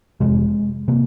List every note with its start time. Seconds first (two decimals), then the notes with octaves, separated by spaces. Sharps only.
0.20 F1 F2 C3 G#3
0.88 C3 A#3